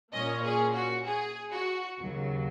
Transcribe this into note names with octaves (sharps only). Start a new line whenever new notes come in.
A#2 A#3 C#4 D#5
G#4
F#4
G#4
F#4
D#2 C#3 F#3